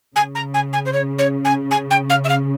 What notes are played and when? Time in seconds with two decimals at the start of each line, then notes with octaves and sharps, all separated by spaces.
0.15 C#3 G#5
0.35 A#5
0.54 G#5
0.73 G#5
0.85 C5
0.93 C#5
1.18 C#5
1.45 G#5
1.71 G#5
1.90 G5
2.10 F5
2.24 E5
2.29 F5